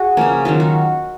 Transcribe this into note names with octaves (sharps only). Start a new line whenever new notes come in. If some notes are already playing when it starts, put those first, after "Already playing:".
Already playing: F#4 G#4
C#3 F3 A#3 C#4
D#3 F#3 C#4 F4
F#4